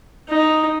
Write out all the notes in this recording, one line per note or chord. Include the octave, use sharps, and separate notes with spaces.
D#4